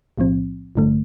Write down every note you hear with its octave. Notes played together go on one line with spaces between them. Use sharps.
B1 A2 F3 C4
A1 G2 D3 A3